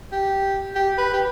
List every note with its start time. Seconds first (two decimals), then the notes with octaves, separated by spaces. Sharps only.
0.12 G4
0.75 G4
0.98 B4
1.13 G4